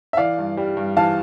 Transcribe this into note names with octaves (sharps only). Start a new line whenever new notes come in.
E5
E3 D5 F5
G2
G3
G2
E3 F5 A5